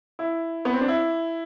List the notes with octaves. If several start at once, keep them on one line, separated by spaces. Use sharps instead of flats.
E4
B3
C4
D4
E4